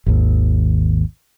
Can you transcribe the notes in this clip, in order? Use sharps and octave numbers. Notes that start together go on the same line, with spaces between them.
G#1 D#2